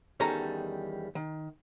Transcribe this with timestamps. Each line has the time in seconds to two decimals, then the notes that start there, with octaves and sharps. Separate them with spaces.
0.20 E2 D#3 G3 C#4 A4 A#5
1.15 D#3